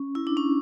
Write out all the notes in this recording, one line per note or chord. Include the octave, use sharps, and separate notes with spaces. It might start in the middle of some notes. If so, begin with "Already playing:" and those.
Already playing: C#4
E4
D4
C#4